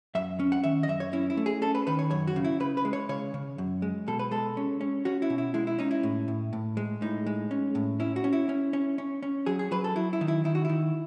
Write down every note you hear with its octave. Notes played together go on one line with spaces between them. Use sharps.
F#2 E5
C#4
F#5
D#3 E5
D#5
F#2 E5
C#5
C#4 E4
E4
A3
G#4
C#4 A4
B4
D#3 B4
C#5
F#2 C#5
F#4
C#3
E4
C#3 B4
B4
G#3
C#5
C#3 C#5
C#3
F#2
G#3
B2 A4
B4
G#3 A4
C#4
C#4
C#4 F#4
E4
B2
E4
G#3 E4
E4
C#4 D#4
E4
A2
A2
A2
G#3
A2 D#4
G#3
C#4
A2
C#4 E4
F#4
C#4
E4
C#4
C#4
C#4
C#4
F#3 G#4
G#4
F#3 B4
A4
F#3 E4
E4
D#3
E4
D#3 E4
F#4
D#3 E4